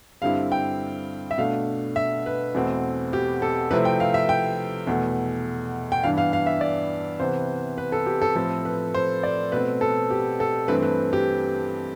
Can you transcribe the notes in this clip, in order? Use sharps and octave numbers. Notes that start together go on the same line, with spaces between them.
G2 D3 G3 C4 E4 F5
G5
E5
B2 A3 D4 F5
E5
B4
E2 B2 A3 C4
G4
A4
C3 F3 A3 C4 E4 B4
G5
F5
E5
G5
E2 B2 A3
G5
G2 E3 B3 D4 F5
F5
F5
E5
D5
C3 E3 B3 C5
B4
A4
G4
A4
A2 F3 A3 C4 A4
B4
C5
D5
B2 A3 C4 B4
A4
G4
A4
G2 E3 A3 C4 B4
B4
G4